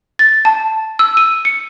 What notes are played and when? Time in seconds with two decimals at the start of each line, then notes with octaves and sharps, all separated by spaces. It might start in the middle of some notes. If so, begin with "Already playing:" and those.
0.19 A6
0.45 A5
0.99 E6
1.17 D#7
1.45 C#7